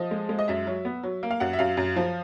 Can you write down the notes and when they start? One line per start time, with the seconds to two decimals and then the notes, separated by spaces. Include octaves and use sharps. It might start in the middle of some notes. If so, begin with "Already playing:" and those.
Already playing: F3 D#5
0.11 G#3
0.29 G#3
0.39 D#5
0.48 F#2 E5
0.67 F#3
0.85 B3
1.03 F#3
1.23 A#3
1.31 F5
1.40 F#2 F#5
1.53 E5
1.59 F#2 F5
1.77 F#2
1.96 F3